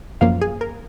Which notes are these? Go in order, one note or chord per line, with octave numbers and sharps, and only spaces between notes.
F#2 F3 A#3 F5
G#4
A#4